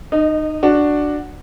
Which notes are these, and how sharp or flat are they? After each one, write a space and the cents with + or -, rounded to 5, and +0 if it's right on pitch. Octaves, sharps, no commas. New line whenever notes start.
D#4 -25 D#5 +0
D4 +5 F#4 +0